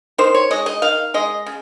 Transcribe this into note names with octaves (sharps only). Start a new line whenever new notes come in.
D#3 C5
C#5
G#3 D#5
D#5
D#3 F5
G#3 D#5
C#3